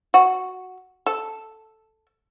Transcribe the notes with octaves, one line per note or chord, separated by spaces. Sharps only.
F#4
A4